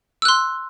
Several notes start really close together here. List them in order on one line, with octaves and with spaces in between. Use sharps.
E6 F#6 C6